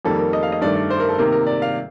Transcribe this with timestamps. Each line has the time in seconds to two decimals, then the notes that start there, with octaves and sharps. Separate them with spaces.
0.05 F2 D#3 G3 A#3 A4
0.19 A#4
0.33 D#5
0.43 F5
0.52 D#5
0.61 G2 D#3 A3 D5
0.76 D5
0.90 C5
1.00 A#4
1.09 A4
1.18 C3 D#3 A#3 A#4
1.32 A#4
1.47 D5
1.62 F5